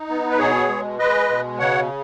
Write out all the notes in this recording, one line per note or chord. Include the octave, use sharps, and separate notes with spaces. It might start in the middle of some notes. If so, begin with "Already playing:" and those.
Already playing: D#4
B3
B4
B2 G#4 C#5
G#3
G#3 B4 D#5
B2
C#3 C#5 F#5